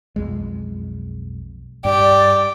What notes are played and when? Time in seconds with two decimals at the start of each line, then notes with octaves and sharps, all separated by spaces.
0.16 B1 F2 G#3
1.85 G2 G4 D5